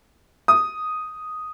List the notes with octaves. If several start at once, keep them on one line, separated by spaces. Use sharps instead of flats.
D#6